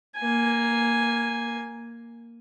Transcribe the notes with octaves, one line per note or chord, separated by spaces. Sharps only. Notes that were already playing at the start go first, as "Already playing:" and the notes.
A#3 G#5